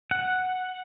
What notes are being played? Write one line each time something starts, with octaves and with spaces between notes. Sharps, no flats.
F#5